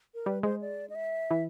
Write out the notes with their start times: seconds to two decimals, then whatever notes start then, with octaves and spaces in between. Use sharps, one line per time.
0.14 A#4
0.26 G3 B4
0.43 G#3 C5
0.61 D5
0.90 D#5
0.95 E5
1.31 E3